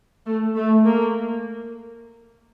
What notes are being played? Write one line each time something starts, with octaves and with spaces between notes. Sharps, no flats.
A3
A3
A#3